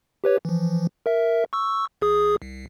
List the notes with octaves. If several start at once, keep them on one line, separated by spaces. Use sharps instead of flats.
G4 B4 C#5
E3 F3
A#4 E5
C#6 E6
G#1 G#4 D#6
C2